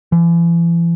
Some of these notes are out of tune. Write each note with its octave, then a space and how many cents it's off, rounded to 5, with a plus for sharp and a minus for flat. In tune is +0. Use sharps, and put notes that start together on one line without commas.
E3 +40